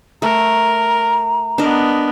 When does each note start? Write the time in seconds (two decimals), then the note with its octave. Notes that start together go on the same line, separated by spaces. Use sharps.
0.22 A3 A#4 A#5
1.58 B3 D4 A#4 D#5